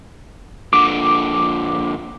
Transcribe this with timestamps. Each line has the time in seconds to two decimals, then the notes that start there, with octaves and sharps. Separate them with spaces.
0.73 A#2 D3 D6